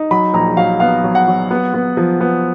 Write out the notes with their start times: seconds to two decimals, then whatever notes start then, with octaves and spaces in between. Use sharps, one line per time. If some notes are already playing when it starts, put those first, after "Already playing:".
Already playing: D#4
0.11 F#3 B5
0.33 A#1 A#5
0.57 F#3 F5
0.80 B3 F5
1.04 F#3
1.15 F#5
1.28 F#3
1.51 B3
1.74 B3
1.97 F3
2.21 B3